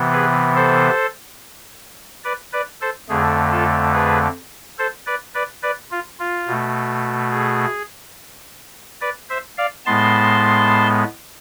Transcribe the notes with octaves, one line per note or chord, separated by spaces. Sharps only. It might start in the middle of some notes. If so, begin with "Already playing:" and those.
Already playing: C3 E3 B3
G#4 B4
A4 C5
B4 D5
B4 D5
A4 C5
F2 D3 A3 G#4
F4 A4
G#4 B4
A4 C5
B4 D5
B4 D5
B4 D5
F4
F4
B2 A3
G#4
B4 D5
C5 E5
D5 F5
A2 G#3 B3 A5 C6